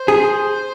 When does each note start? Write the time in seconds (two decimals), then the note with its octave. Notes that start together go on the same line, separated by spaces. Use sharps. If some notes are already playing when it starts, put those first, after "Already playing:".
Already playing: C5
0.08 G#4